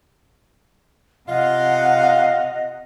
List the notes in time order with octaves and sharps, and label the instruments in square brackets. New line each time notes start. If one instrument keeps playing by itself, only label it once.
[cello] C3 F#5 [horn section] F4 F5 [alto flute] D#5